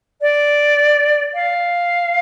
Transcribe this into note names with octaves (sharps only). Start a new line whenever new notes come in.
D5
F5